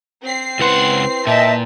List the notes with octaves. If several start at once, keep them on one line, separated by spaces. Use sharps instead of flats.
C4 C7
C#2 E4 B4 F#5 C6
A#2 D#5 E5 G5 A5